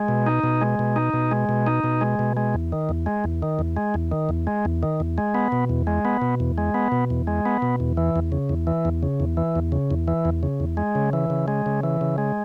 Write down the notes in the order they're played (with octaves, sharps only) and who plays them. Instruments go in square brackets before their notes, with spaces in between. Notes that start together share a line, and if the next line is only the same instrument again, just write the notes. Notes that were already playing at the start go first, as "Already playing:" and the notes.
Already playing: [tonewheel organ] G#3
B2
D#4
B2
G#3
B2
D#4
B2
G#3
B2
D#4
B2
G#3
B2
G#3
E2
D#3
E2
G#3
E2
D#3
E2
G#3
E2
D#3
E2
G#3
E2
D#3
E2
G#3
B3
B2
E2
G#3
B3
B2
E2
G#3
B3
B2
E2
G#3
B3
B2
E2
E3
E2
C#3
E2
E3
E2
C#3
E2
E3
E2
C#3
E2
E3
E2
C#3
E2
G#3
C#3
E3
C#3
G#3
C#3
E3
C#3
G#3